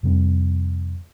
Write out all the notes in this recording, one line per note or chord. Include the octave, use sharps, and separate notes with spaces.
F2 C3 G3 C4